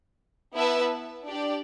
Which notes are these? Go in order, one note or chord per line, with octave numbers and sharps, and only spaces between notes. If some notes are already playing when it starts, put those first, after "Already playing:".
B3 E4 B4 E5 A5
D4 G4 D5